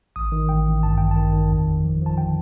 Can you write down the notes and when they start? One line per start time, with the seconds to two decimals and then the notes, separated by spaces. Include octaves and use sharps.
0.16 A1 D#6
0.32 D#3
0.49 A1 G5
0.67 A1
0.83 G2 A5
0.98 A1 G5
1.11 A5
1.16 D#3
1.33 D#3
1.50 F2
1.67 G1
1.85 F3
2.02 F3 A5
2.18 D3 G5